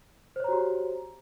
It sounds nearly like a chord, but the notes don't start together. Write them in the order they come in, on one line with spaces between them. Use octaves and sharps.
C5 C#5 A#5 F#4 G4